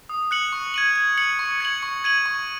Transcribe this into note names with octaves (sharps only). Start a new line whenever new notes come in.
D#6
F#6 C#7 F#7
C#6
G#6 D#7 F#7
G#6
C#7 F#7
C#6
G#6 C#7 F#7
C#6
G#6 D#7 F#7
C#6